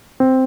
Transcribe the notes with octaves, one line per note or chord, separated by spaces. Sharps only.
C4